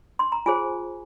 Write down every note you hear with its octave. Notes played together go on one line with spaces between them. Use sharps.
C6
A#5
F4 G#4 C5 G#5